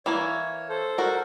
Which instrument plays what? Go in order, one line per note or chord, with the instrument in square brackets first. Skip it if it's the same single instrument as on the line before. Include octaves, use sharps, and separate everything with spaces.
[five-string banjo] E3 A#3 E4 [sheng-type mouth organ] C#5
[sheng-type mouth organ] A4 C5
[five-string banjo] F#4 A#4